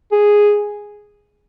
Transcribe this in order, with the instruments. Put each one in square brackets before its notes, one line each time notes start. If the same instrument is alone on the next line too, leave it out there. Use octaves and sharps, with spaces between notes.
[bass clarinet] G#4